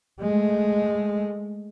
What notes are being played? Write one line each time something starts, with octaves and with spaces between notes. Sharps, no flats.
G#3 A3